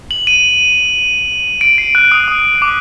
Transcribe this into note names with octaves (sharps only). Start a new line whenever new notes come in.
F#7
D#7
D7
C7
F#6
D#6
D#6
D6